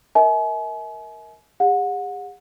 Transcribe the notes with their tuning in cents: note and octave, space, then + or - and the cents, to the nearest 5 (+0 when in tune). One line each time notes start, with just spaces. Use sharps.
A#4 +0 E5 -40 G#5 +40
G#4 -45 F#5 -30